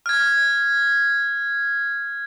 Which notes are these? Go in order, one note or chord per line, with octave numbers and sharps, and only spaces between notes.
F6 G#6